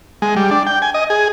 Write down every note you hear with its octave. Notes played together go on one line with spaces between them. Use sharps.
G#3
G3
D4
G5
G#5
D#5
G#4